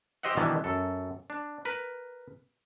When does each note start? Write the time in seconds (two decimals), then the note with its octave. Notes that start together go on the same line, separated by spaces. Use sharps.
0.23 G4 C5 D#5 E5 F#5
0.37 B2 D#3 E3 G3 B3 D4
0.64 F#2 A4
1.30 D4
1.65 A#4 B4